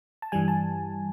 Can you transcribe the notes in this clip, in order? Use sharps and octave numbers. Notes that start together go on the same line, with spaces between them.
A5
G2 E3 G3 G#5
A5